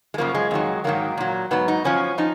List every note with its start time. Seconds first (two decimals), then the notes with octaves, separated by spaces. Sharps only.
0.14 G#3
0.18 F#2 C#3 F3 A#3
0.35 G#3
0.51 F2 D#3 F#3
0.84 G#2 D#3 F#3 A#3
1.18 A#2 F#3
1.51 G#2 F#3 B3
1.68 D#4
1.84 F#2 F3 C#4
2.18 F3 D#4